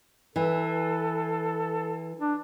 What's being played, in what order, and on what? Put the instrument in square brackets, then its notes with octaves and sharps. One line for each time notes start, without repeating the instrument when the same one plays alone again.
[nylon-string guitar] E3 [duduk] A4
[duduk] D4